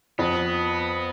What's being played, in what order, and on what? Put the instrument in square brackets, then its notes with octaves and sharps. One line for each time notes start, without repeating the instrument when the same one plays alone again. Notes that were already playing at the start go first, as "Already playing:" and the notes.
[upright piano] F2 [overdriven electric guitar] B3